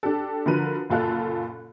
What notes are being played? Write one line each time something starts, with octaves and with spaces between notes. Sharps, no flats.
D4 G4 A4
D3 F3 F#4 A#4 B4 D#7
F#1 A#2 F4 A4 F5 F#6